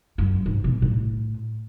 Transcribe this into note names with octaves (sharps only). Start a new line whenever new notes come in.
F#2
G#2
B2
A2